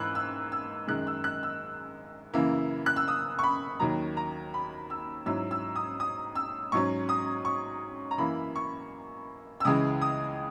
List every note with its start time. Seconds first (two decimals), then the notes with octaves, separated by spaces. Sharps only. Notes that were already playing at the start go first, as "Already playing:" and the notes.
Already playing: G#2 E3 A#3 B5 E6 F#6
0.15 E6
0.52 E6
0.87 F#2 D#3 G#3 F#6
1.07 E6
1.24 F#6
1.43 E6
2.33 F#2 C#3 E3 A#3 E4
2.86 F#6
2.96 E6
3.08 D#6
3.39 C#6
3.43 B5
3.80 D#2 D#3 F#3 A#5
4.17 A#5
4.54 B5
4.90 E6
5.26 G#2 F#3 C#4 E4 E6
5.51 E6
5.76 D#6
6.00 D#6
6.35 E6
6.72 G#2 F#3 C#4 C#6
7.09 D#6
7.45 C#6
8.11 A#5
8.18 F#2 E3 A#3 E4 B5
8.56 C#6
9.60 E6
9.65 C#2 C#3 E3 G#3 D#6
10.01 D#6